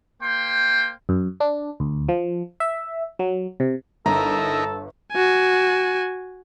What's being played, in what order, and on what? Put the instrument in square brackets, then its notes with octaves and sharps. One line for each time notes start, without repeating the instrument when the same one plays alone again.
[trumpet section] A#3 C5 G5 C6
[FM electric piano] F#2
D4
D2
F3
E5
F#3
C3
[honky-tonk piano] G1 [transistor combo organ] D#4 E4 A#4 [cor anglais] A4 [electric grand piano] A#5
[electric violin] F#4 G#5